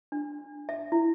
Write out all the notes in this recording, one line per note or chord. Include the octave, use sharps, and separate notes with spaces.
D4
E5
E4